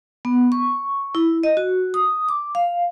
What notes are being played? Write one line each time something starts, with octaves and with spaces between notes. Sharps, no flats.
B3
C#6
E4
D#5
F#4
D#6
D6
F5